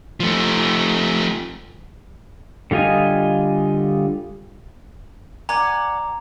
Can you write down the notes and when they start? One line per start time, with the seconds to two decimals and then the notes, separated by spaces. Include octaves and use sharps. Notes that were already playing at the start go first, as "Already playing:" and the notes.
0.20 F3 A3
2.71 D3 G3 F4 D#5 G#5
5.49 D5 F#5 G#5 A#5